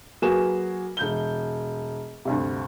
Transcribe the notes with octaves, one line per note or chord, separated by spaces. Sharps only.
F#3 A#3 F#4 G#4 B4 E7
E1 G6 G7
D2 G2 C3